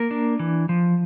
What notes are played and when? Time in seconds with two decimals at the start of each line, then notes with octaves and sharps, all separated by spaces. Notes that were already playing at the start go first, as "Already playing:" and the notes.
Already playing: A#3 A#4
0.11 D4
0.39 E3
0.69 F3